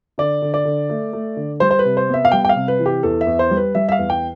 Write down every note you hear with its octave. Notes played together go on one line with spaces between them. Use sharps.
D3 D5
D3
D5
D3
A3
A3
D3
G3 C5
C5
B4
C3
C5
B3 E5
F5
G3 G5
G5
F5
C3
B4
E3
G4
E2 A4
E5
E2
C5
G3
B4
G3 E5
E5
F5
E2
G5